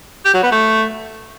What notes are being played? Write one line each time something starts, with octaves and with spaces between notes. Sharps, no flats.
G4
F#3
B3
A3